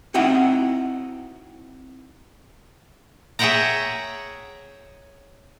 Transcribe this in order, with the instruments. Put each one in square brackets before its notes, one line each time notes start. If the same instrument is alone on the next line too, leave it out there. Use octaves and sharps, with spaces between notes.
[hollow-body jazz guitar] C4 D#4 E4 F#4 F#5 G5
[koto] G#4 C#5 E5 F#5 G5 A#5